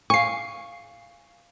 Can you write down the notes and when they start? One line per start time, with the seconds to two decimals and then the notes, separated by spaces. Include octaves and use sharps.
0.10 F5 G#5 C#6 C7